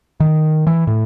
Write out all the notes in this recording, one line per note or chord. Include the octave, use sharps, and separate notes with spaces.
D#3
E3
A2